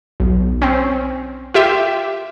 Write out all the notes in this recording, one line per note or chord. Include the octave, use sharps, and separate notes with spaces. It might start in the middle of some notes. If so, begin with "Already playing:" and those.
B1
C4 C#4
F4 G4 E5